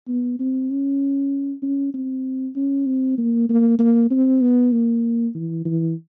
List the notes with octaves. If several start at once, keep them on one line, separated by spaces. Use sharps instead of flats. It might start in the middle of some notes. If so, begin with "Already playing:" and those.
B3
C4
C#4
C#4
C4
C#4
C4
A#3
A#3
A#3
C4
B3
A#3
E3
E3